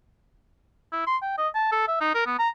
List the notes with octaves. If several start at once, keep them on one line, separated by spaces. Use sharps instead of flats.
E4
C6
G5
D#5
A5
A4
E5
D#4
A#4
B3
A#5